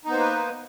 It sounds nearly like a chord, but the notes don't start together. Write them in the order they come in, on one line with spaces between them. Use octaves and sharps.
D#4 B3 C5 A#3 B4